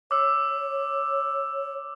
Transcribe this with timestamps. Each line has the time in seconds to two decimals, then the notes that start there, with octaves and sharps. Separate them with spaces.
0.11 C#5 D6 E6